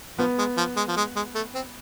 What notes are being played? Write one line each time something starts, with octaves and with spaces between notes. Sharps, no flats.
F3 B3
G#3
F3
G#3
F3
G#3
G#3
A3
C4